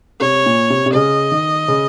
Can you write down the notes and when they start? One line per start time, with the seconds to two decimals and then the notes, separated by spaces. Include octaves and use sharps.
0.21 C3 C#5
0.46 A#2
0.70 C3
0.86 C3
0.94 C#3 D#5
1.32 D#3
1.68 C#3